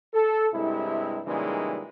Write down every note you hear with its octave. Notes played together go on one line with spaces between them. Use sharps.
A4
G2 C3 G#3 E4
A#2 C#3 E3 G3 G#3 D#4